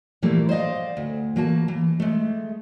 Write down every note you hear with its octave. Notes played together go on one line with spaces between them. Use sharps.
A#2 E3 F3 G3 A3 A#3
C5 D5 D#5 F5
D2
E3 A#3 F#4 A5
E3
G#3 A3